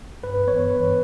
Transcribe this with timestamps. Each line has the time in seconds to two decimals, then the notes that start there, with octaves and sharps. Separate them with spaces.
0.24 G2 B4
0.47 E3 B3 C#5
0.70 G2 B4